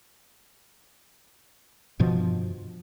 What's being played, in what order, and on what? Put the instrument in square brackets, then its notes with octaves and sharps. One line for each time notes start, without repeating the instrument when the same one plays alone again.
[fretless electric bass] G2 B2 F3